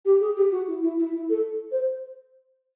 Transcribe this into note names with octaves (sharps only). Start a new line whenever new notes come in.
G4
G#4
G4
F#4
E4
E4
E4
E4
A4
C5